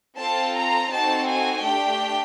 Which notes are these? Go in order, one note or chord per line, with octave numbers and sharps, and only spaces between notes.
C4 F4 A4 A5
A#5
C4 D#4 F#4 A4 A5
G#5
A3 D4 G4 G5